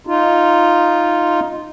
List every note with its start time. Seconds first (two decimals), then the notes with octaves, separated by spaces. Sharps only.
0.07 D#4 F4